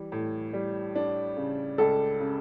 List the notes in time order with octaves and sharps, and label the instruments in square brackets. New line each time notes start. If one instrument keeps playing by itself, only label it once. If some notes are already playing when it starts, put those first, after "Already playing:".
Already playing: [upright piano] E3 G3
A2
G3
D4
C#3
[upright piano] C#2 [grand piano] A4
[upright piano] C#3